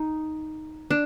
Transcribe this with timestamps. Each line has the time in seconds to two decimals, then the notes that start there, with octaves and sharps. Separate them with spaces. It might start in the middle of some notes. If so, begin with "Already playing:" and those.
Already playing: D#4
0.91 D4